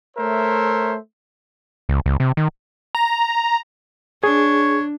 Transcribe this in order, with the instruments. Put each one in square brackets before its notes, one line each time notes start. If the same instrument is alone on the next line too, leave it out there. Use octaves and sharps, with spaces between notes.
[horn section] A3 A#4 C5 C#5 E5
[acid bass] C#2
C#2
C3
D#3
[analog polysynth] A#5
[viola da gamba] D4 [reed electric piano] G#4 [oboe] C#5